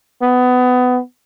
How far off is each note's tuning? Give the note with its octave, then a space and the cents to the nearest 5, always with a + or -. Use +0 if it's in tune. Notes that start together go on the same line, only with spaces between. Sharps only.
B3 +20